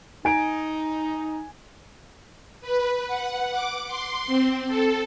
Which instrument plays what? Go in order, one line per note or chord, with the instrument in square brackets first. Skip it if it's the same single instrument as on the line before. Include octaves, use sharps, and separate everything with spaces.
[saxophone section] D#4 [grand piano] G#5 D7
[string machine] B4
F#5
D6
C6
C4
A4